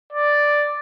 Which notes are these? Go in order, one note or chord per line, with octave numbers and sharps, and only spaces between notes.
D5